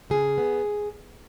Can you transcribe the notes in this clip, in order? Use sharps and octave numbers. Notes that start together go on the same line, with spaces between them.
C#3 G#4
B3